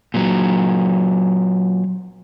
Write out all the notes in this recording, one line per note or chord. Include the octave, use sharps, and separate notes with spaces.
A#2 F#3